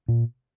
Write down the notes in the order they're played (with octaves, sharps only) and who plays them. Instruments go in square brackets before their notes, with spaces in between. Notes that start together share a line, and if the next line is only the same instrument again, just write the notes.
[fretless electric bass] A#2